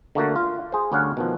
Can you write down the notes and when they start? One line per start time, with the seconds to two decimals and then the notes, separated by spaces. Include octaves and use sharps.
0.15 D3 A3 A#3 F#4
0.36 F4
0.72 G#4 C5
0.92 D2 G3 C#4 C#5 F5 F#5
1.17 B2 D#3 F3